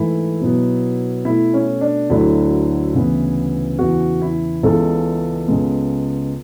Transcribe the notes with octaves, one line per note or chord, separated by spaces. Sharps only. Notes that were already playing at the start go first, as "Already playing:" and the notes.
Already playing: G#2 E3 A3 E4
B2 F#3 B3
B2 A3 E4
C#4
D4
D2 D3 F#3 A3 E4
D2 C#3 E3 B3
E2 C#3 E3 F#4
E4
C#2 C#3 E3 G#3 B3 A4
C#2 C#3 G#3 B3